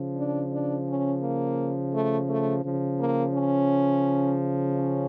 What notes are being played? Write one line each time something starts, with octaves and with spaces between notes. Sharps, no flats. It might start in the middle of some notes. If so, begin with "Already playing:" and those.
Already playing: C#3 F3
D4
D4
C#4
A#3
A3
A3
C#3 F3
A#3
C#4
C#4